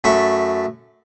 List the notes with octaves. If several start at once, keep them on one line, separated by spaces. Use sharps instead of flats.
F#2 A3 B5 C#6